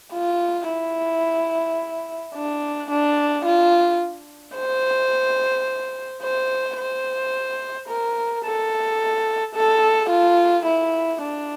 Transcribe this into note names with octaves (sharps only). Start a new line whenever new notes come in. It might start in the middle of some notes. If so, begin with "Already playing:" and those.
F4
E4
D4
D4
F4
C5
C5
C5
A#4
A4
A4
F4
E4
D4